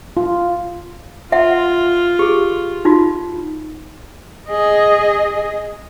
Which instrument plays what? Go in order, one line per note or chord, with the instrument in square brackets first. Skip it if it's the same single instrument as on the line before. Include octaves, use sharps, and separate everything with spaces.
[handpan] F4
[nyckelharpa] F4 [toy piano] E5 F#5
[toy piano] G4 G#4
D#4 F4 F#4
[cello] G#4 D#5